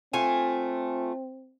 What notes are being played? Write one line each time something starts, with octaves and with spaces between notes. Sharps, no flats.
A3 C4 F4 G#5